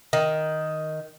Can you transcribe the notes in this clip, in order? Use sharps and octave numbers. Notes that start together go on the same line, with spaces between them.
D#3